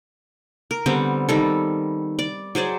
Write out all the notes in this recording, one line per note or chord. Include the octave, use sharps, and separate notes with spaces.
A#4
D3 G3 B3 C4
D#3 G3 A4
D5
F#3 G#4 C5 D5